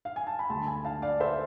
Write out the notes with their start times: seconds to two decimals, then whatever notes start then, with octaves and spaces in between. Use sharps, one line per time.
0.05 F5
0.16 G#5
0.27 A5
0.39 B5
0.50 D2 D3 G#3 A5 C6
0.67 G#5 B5
0.85 F5 A5
1.02 D5 F5
1.20 C5 E5